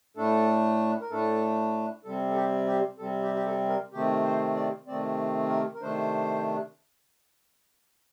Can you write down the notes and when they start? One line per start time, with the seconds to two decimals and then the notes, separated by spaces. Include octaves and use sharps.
0.17 A2 A3 D4 A4
1.01 A#4
1.10 A2 A3 D4 A4
2.05 C3 G3 C4 A4
2.30 A4
2.36 G4
2.67 G4
2.99 C3 G3 C4 A4
3.23 G4
3.35 G4
3.46 A4
3.69 A#4
3.93 C3 D#3 A3 C4 G4
4.25 C5
4.56 D5
4.87 C3 D#3 A3 C4 D5
5.49 A#4
5.74 A#4
5.81 C3 D#3 A3 D4 C5